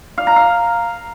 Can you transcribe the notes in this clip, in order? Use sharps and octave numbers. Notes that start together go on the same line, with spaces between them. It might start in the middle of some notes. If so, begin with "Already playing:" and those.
F5
A#5
F5